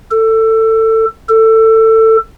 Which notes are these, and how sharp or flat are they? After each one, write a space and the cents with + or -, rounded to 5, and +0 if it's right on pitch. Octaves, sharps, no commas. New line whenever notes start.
A4 +20
A4 +20